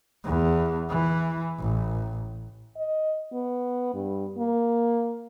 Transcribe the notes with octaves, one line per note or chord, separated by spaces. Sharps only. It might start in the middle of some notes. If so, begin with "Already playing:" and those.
E2
E3
A1
D#5
B3
G2
A#3